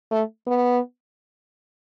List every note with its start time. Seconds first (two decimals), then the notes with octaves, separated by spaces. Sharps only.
0.11 A3
0.47 B3